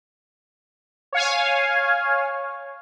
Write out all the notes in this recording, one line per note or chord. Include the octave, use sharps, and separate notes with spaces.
C#5 F5 G#5